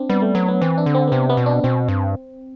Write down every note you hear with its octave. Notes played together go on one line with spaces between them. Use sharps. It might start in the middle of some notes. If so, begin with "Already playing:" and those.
Already playing: C4 D4
G3 B3
A3
F#3 B3
B3
E3 C4
D4
D3
C4
B3
C3 C4
B3
B2
D4
B2 C4
G2